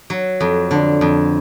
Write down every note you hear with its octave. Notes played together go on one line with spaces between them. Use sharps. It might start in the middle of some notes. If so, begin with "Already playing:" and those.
F#3
F2
D3
F2